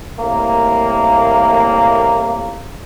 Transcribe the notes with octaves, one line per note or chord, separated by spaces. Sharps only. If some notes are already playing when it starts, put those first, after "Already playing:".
C2 A2 A#3